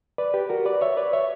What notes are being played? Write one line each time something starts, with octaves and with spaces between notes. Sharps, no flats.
B4 D5
G4 B4
F#4 A#4
B4 D5
C#5 E5
B4 D5
C#5 E5